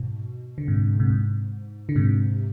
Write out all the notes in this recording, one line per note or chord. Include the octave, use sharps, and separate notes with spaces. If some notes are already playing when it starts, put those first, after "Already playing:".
Already playing: G#2 B2
D3
G#2 C3
G#2 C3
G#2
D3
G#2 C3